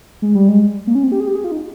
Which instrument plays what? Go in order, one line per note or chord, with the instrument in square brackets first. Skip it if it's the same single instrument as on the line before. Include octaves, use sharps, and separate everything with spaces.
[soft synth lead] G#3
G3
G#3
A#3
C#4
C4
G4
G#4
G4
G#4
F4
D#4